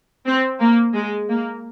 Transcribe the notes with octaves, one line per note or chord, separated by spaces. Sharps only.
C4
A#3
G#3
A#3